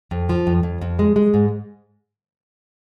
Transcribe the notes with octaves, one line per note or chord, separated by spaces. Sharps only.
F2
F3
F2
F2
F2
G#3
G#3
G#2